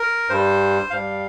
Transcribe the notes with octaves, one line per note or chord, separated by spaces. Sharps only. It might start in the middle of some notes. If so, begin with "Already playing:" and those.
Already playing: A#4
G2 G3 C5
G2 G3 F5